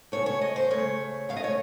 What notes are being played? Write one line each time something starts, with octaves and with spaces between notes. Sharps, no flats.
C#3 A3 C#5
C#5
D#5
C5
C#3 A3 C#5
C#3 A3 F5
D#5
C#5